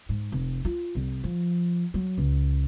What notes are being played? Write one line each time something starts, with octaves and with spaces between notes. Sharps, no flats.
G#2
F1
F4
C2
F3
F#3
C#2